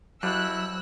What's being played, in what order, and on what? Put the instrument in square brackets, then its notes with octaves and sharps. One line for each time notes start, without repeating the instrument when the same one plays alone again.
[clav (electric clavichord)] F2 G3 [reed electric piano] F#3 [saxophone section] E4 F#4 [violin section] E6 F#6